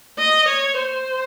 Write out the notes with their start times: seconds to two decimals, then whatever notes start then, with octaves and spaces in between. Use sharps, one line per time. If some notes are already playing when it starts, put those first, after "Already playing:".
0.19 D#5
0.48 C#5
0.79 C5